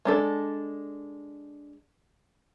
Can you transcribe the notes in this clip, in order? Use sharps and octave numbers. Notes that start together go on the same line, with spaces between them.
G#3 D4 A4